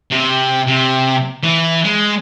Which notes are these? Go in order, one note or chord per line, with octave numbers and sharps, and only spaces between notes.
C3
C3
E3
G#3